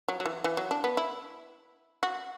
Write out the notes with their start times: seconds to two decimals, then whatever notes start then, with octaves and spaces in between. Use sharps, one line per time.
0.08 F#3
0.20 F#3
0.26 E3
0.44 E3
0.57 F#3
0.71 D4
0.84 B3
0.97 E4
2.03 F#4